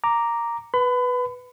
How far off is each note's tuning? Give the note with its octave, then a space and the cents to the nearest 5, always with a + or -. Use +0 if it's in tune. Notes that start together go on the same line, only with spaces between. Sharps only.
A#5 +0 D6 +0
B4 +0 B5 +30